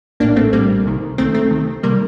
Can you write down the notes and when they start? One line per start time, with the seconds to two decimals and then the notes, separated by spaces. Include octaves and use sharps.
0.20 A#1 A2 A#3 D4
0.36 A3 C4
0.52 A#1 A2 G3 A#3
0.86 C2 C3 D#3
1.18 C2 C3 D#3 A3 C4
1.34 A3 C4
1.50 C2 C3 D#3
1.83 C3 D#3 G3 A#3